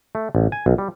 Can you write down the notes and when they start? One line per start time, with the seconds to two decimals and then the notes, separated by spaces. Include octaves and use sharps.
0.15 A3
0.35 A1
0.52 G#5
0.66 B1
0.78 G3